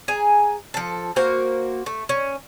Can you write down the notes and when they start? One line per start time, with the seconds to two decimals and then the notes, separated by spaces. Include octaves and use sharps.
0.08 G#4 G#5 A#5
0.74 F3 A4
1.16 A#3 F#4 C5
1.86 A3
2.09 C#4